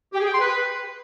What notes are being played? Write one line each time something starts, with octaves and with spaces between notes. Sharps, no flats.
G4
G#4
G5
C6
B4